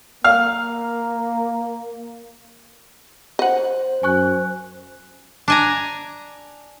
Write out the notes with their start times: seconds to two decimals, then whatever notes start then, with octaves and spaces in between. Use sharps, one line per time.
0.24 A#3 F5
3.39 C5 D#5 F#5
4.03 F#2 G#5 C#6 F#6
5.48 D4 G#5 A#5